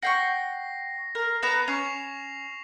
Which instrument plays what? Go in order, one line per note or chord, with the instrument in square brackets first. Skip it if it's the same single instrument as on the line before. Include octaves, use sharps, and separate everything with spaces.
[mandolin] F#5 G5 C#6 [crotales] A#6 C7
[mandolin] A#4
[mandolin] B3 B4 A#5 [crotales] E7
[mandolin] C#4 [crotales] C#6 C7 F7